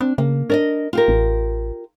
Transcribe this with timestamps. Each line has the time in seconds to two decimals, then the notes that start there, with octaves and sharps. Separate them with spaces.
0.01 C4 D4
0.18 C#3 A#3
0.50 D4 A#4 D5 D#5
0.93 F4 G4 A#4
1.08 A1